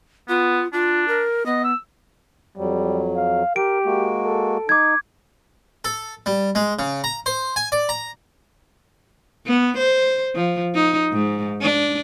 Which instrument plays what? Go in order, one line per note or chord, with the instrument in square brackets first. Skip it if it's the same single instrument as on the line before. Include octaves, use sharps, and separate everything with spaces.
[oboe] B3 [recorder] F4
[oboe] D4 [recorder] F4
[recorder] A#4
[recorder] B3 [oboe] D#5
[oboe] E6
[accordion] F2 F#3 [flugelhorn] G3
[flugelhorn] F5
[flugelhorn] G4 [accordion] A#4 [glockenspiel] D7
[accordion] G#3 A#3 F#4
[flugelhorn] A4
[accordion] D#4 [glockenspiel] D6 G#6
[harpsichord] A4
G3
G#3
C#3
A#5
C5
G#5
D5
A#5
[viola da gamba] B3
C5
F3
D#4
G#2
D4